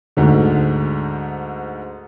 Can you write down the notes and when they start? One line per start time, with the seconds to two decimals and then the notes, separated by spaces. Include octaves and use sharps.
0.17 D2 G#2 D3